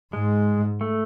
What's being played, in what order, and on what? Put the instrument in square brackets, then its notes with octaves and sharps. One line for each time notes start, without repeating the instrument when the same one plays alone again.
[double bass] G#2 [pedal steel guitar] G#3
[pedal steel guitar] A3